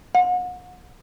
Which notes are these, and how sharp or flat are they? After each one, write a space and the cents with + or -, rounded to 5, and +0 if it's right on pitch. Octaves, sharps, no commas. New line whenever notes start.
F#5 -40